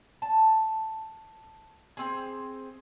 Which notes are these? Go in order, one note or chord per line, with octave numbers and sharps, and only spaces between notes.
A5
C4 G#4